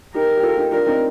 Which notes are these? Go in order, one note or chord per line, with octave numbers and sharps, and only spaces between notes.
D#4 G4 A#4
G4
F4 A4
D#4 G4
D4 F4 A#4
C4 D#4